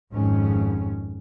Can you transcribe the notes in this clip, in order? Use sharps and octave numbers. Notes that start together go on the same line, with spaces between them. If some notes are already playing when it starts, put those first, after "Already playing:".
G#1 F2 G#2 C#4